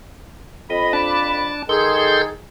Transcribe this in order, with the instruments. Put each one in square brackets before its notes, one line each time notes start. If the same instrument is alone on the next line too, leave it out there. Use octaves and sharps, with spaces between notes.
[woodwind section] F2 B5 [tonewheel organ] D#5
[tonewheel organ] D4 A5
[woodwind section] D#3 G#4 [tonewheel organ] A4 C6 G6